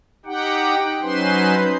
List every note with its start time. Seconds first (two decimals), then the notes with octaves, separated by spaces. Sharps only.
0.26 D#4 G4 F#5 G5
1.02 F#3 C#4 D#4 B4 C5 C6